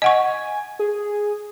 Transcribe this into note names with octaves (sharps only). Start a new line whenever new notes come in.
D#5 F#5 G#5 C#6
G#4